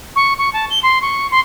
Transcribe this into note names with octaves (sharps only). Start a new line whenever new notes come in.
C#6
C#6
A5
G7
C6
C#6
C6